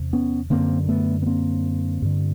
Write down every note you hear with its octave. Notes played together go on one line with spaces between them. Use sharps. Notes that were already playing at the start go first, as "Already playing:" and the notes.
Already playing: E2 C3
B3 C#4
F#2 D3 A#3 C4
A3 B3
B3
A#3 C4
G2 D3